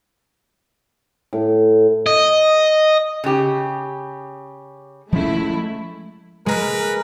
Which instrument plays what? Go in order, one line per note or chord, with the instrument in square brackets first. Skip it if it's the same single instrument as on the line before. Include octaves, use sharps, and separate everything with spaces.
[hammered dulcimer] A2
[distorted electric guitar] D#5
[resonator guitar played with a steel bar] C#3 G4
[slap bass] F3 C#4 [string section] G#3 A3 E4
[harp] G#3 [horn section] A#4 B4